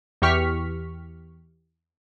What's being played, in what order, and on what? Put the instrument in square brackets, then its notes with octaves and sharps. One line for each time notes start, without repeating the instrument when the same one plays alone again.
[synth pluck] E2 E3 G4 C#6 F6 B6